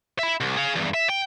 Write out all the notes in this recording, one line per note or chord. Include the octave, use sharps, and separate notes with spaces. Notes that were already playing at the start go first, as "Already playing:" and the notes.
E5 B5
C2
G#4 F5
E2 G2
E5
G5